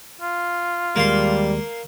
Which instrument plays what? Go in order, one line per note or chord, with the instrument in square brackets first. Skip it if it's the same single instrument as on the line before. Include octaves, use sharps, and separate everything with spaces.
[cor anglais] F4
[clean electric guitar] D#2 G#3 [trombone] G3 [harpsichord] A#3 C6